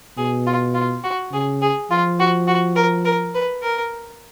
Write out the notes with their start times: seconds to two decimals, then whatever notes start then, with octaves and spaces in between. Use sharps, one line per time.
0.18 B2 G#4
0.46 F4
0.74 F4
1.04 F#4
1.32 C#3 G#4
1.62 G#4
1.91 F3 F4
2.20 F#4
2.48 F#4
2.76 A#4
3.05 A#4
3.35 B4
3.63 A#4